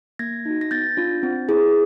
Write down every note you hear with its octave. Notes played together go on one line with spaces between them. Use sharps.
A#3 G#6 A#6
D#4 F#4
A#6
B3 G6 A6
D4 F4
C4
E4 G#4